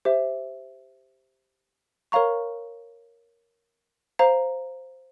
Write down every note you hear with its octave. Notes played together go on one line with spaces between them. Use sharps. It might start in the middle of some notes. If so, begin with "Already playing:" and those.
G4 C5 E5
A#4 C#5 F5 A#5 C#6
C5 F5 A#5